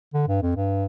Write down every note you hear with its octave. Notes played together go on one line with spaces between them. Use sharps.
D3
G2
F2
G2